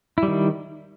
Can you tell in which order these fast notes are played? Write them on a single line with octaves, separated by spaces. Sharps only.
E4 G3 D#3